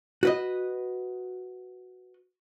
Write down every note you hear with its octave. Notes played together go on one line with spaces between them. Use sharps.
F#4 B4 D#5